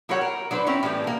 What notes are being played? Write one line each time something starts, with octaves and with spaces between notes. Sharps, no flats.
F#3 E4 G4 A#4 C#5 F#5
A#4
F#3 D4 B4 C5
C4 C#4 E4
A2 E3 G3 G4
A#3 D4